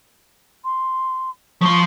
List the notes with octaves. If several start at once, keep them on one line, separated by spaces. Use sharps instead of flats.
C6
F3 C6 C#6